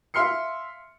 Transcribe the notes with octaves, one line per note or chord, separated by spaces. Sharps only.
E5 F5 C6 F6 C7 C#7